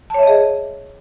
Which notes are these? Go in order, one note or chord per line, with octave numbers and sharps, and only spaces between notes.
G#4 C#5 D#5 E5 A5